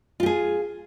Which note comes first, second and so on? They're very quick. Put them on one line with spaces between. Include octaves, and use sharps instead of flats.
F4 G4 G#4